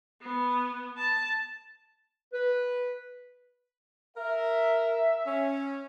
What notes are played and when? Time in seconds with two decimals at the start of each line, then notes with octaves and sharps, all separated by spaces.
0.22 B3
0.97 A5
2.33 B4
4.17 A#4 E5
5.27 C#4